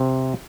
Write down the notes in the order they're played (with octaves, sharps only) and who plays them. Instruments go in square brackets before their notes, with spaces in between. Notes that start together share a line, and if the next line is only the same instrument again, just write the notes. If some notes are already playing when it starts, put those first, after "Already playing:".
Already playing: [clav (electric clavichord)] C3